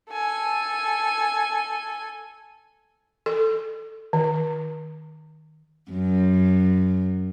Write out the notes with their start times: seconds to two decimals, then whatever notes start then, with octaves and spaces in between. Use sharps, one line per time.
0.11 A4 G#5
3.26 A4
4.13 D#3
5.90 F#2